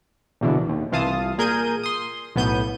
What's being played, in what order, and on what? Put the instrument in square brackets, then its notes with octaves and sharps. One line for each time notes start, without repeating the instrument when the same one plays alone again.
[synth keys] A#1 E2 B2 D3 E3
D#2
C2 E3 F4 F5 A5 D#6
A#2 G#4 A#4 G6 G#6 D#7
C6 D#6
B1 A2 B3 G6 D#7